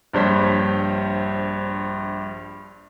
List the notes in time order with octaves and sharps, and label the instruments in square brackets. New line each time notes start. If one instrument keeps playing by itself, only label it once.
[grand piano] A#1 G2 C5 C#5 B6